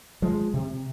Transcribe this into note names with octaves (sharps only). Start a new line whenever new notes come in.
F3 G#3
C3